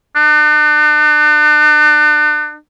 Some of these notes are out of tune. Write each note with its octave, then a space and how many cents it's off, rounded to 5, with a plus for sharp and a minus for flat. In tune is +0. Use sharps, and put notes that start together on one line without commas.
D4 +40